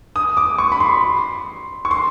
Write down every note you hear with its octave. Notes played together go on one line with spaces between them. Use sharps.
D#6
D6
C#6
B5
C6
C#6
C6